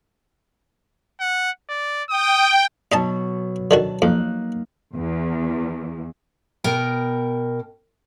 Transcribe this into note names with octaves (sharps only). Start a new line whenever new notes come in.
F#5
D5
G5 D#6
B2 F#3 D#4 D#5 A5
D3 D#3 F#4 A5
F2 A#3 D#4 F#6
E2
B2 A#4 G5